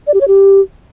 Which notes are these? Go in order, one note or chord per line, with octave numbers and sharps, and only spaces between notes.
D5
G4
C#5
G4